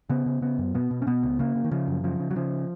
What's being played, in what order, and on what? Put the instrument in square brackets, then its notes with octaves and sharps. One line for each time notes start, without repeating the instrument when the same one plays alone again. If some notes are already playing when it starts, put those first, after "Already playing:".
[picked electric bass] C#3 B3
C#3
C#3 B3
F#2
B2 B3
B2
C#4
B2 B3
C#2
C#3 A#3
C#3
D#3
C#3 F3
F#2
C#3 F3
C#3
F#3
C#3 F3